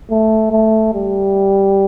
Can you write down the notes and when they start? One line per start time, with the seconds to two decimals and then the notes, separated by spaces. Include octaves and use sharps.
0.10 A3
0.52 A3
0.94 G3